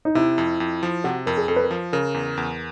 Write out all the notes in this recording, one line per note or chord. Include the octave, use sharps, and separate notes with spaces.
D#4
C3 E4
F2
F2
F3
C3 F#4
F2 A#4
G#4
F2 A4
B4
A#4
F3
C#3 A#4
E2
E2